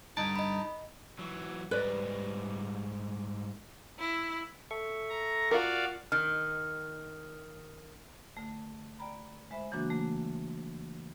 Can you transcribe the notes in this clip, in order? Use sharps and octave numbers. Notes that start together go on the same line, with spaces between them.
G2 D3 D#4 A5 D7
D#5 B5
E3 F#3
G#2 G3 B4 D5 D#5
E4
A4 E5 C#6
A#5
F4 F#4 A#4 D5 F5
D#3 F6
D3 A3
D5 G5 A#5 B5
G#3 C5 E5 B5
C#3 E3 F#3 A#3 D4 F#4
A3 A#3